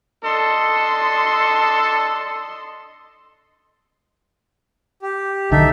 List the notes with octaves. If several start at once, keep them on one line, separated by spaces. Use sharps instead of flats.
D4 A4 D#5 C6
G4
B1 D3 D#3 D#4 A4 E5